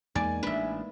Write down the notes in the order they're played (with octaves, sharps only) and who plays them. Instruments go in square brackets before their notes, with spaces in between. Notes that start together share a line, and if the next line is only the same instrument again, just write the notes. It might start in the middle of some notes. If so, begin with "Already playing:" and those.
[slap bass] E2 [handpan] G#3 A#3 D#4 [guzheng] D5 [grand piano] G#5
[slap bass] A1 D4 [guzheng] B4 E5